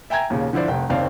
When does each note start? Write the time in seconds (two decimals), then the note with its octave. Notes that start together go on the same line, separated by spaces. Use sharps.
0.10 E5 G5 G#5 A#5 G#6
0.30 D#2 A#2 C#3
0.53 D3 F3 E4 C5 D5
0.68 F1 C2 G5
0.90 F#1 D#2 D#3 C4 D5 F5